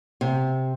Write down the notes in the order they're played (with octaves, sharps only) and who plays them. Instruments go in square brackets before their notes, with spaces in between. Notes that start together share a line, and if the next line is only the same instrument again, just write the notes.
[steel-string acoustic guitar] C3